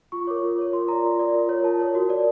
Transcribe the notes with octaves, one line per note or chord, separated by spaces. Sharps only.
F4 C#6
A#4 C#5 D6
F4
A#4 C#5
F4 C6
A#4 D5 A#5
F4
A#4 D5
F4
A#4 C#5
F4 A5
A#4 C#5
F#4
A#4 D5